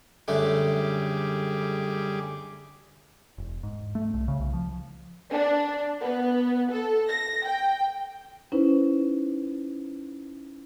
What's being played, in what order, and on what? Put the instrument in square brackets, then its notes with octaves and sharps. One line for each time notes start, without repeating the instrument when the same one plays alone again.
[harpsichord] F#2 D3 A3 [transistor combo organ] G3 G#4 D6
[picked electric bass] E1
G#2
A3
C2
C#3
C2
F3
[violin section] D4
B3
A4
A#6
G5
[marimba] C#4 D#4 E4 B4 C5